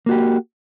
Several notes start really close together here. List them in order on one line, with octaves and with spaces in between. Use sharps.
A#3 F#4 G4